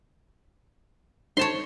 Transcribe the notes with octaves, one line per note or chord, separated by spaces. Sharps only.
D#4 C5 C#5 A5 C6